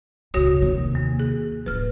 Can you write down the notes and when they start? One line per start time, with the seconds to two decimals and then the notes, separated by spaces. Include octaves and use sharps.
0.34 C#2 C#3 F#4 C#5 D#6
0.62 D#2 C3
0.95 A#3
1.19 G#4
1.66 D1 B4 F6